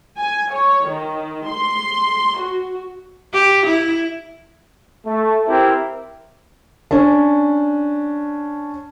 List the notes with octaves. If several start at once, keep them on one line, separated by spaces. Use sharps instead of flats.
G#5
C#5
D#3
C6
F#4
G4
E4
A3
C4 E4 G4 A#4
C#4 D4